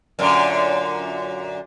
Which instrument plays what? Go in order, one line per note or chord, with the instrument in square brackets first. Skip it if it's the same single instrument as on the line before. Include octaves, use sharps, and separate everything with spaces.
[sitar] F#2 A#2 D3